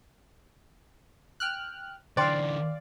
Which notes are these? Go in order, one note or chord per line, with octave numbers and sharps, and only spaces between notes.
G5 F6 F#6
D3 E3 C5 D5 F5 G5 C6